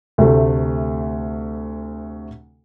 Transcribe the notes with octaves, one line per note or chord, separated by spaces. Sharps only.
D2 C3 A3